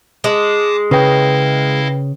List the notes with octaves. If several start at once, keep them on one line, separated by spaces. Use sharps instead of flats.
G#3 A5 D6 D#6
C#3 E4 B4 D#5 F5 G5